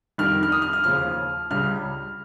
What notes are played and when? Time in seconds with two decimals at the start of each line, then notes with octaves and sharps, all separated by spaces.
0.18 F2 D#3 G3 F6
0.43 F6
0.52 D#6
0.62 F6
0.73 F6
0.84 D#2 C#3 F3 F6
1.51 C#2 C#3 G3 F6